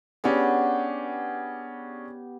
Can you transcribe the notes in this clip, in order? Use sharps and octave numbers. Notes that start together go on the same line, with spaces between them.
B3 C#4 D4 G4 G#4